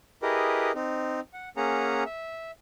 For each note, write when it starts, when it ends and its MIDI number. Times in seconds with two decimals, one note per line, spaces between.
0.22 0.72 64
0.22 0.72 67
0.22 0.72 68
0.22 0.72 70
0.22 0.72 71
0.22 0.72 75
0.75 1.20 60
0.75 1.20 63
1.33 1.49 78
1.57 2.04 58
1.57 2.04 61
1.57 2.04 68
1.57 2.04 78
1.57 2.04 82
2.06 2.51 76